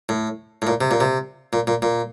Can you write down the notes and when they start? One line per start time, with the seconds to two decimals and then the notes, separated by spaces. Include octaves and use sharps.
0.09 A2
0.62 A2
0.67 A#2
0.81 C3
0.91 A#2
1.01 C3
1.53 A#2
1.67 A#2
1.82 A#2